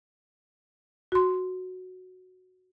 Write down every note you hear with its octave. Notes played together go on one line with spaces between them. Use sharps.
F#4 C6